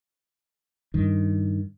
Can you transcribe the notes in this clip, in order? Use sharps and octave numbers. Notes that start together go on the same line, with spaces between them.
G2 D#3